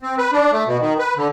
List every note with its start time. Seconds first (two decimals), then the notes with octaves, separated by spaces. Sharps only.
0.02 C4
0.18 B4
0.32 D4
0.52 A3
0.67 B2
0.81 D#3
0.99 B4
1.17 D3